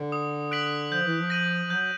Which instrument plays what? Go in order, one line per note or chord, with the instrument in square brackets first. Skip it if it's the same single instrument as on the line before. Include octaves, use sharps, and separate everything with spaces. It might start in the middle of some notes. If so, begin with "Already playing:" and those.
Already playing: [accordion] D3
[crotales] D#6
F#6 B6 D7 F#7
[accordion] F3 [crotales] G6
[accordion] E3
F3
[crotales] A#6 D#7 F#7
[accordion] F#3 [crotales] G6